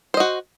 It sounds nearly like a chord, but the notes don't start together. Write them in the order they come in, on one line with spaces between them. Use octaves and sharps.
C5 D#5 F#4